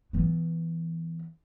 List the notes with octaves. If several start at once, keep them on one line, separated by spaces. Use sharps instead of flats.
E3 B3